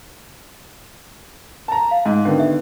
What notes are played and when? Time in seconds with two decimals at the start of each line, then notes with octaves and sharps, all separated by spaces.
1.68 A5 A#5
1.91 F5
2.06 G#2
2.25 D3 D#3 B3 G5
2.38 G4 E5